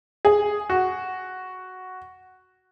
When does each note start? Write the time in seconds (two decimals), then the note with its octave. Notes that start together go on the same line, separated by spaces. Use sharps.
0.25 G#4
0.69 F#4